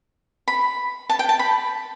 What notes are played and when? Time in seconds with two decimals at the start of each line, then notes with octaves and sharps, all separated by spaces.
0.48 B5
1.09 A5
1.19 G5
1.29 A5
1.39 B5